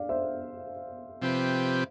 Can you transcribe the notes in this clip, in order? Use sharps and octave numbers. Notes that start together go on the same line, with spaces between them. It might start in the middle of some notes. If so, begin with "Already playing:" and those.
Already playing: D5 F5
C5 E5
C3 F3 C4 G4 B4